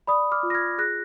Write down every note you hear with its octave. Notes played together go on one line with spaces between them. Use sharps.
D5 B5 D#6
D6 F6
F4
A#6
F6 G#6
G#4 F#6 A#6